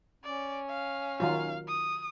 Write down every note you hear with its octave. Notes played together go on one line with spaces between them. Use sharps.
C#4 D5
F5
D#3 F#3 F4 F5
D#6